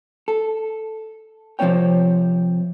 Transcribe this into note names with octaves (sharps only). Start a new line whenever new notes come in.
A4
C3 F3 A#3 C4 C#5 G5